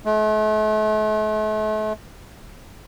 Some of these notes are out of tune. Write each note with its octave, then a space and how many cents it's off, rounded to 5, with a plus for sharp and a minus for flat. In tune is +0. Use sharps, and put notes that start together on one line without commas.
A3 -40